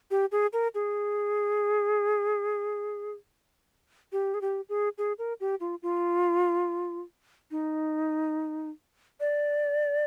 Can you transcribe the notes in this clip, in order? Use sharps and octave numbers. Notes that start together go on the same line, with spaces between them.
G4
G#4
A#4
G#4
G4
G#4
G4
G#4
G#4
A#4
G4
F4
F4
D#4
D5